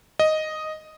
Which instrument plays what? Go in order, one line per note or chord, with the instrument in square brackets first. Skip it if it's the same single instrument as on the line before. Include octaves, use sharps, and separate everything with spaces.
[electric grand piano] D#5